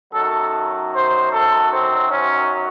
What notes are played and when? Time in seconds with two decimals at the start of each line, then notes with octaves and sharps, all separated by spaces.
0.13 F#2 D#3 F#3 A4
0.93 C5
1.32 A4
1.72 C4
2.10 C#4